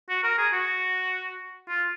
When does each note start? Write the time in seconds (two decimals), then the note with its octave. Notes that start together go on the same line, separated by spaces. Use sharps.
0.09 F#4
0.23 A#4
0.38 G#4
0.53 F#4
1.68 F4